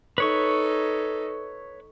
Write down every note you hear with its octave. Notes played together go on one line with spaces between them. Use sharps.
D#4 A4 B4 C#5 C#6